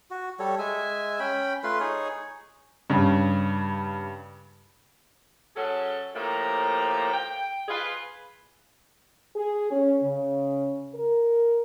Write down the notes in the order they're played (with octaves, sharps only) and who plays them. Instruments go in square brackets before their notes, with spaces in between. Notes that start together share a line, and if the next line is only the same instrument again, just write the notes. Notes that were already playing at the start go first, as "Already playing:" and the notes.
[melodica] F#4
G3 A4 C#5
G#3 E5 G#5
C#4 G5 B5
A3 F4 B4 C6
D#4 G#4 C#5
[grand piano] G2 C#3
[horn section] F#3 C#4 G#4 A4
A2 F3 A3 A#3 G4 A#5
G5
F4 G#4 B4
[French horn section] G#4
C#4
C#3
A#4